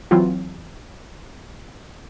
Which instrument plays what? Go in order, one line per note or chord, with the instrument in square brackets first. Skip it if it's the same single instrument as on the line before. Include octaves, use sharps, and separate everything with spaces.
[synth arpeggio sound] E3 F#3 C4 F4